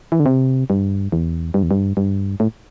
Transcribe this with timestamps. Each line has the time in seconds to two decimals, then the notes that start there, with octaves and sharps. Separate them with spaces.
0.12 E3
0.20 D3
0.26 C3
0.70 G2
1.12 E2
1.54 G2
1.63 E2
1.71 G2
1.97 G2
2.40 A2